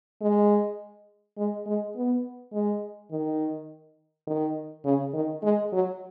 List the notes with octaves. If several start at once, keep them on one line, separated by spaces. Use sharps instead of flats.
G#3
G#3
G#3
B3
G#3
D#3
D#3
C#3
D#3
G#3
F#3